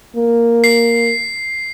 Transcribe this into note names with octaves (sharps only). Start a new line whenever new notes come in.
A#3
C7